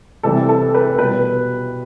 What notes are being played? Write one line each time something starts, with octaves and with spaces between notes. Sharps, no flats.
C3 E3 G3 A4
A4
B4
B2 G3 B4